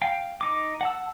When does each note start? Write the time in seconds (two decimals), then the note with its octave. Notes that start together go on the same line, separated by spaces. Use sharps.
0.02 F5 G5
0.41 D#4 D6
0.81 F#5 A5 E6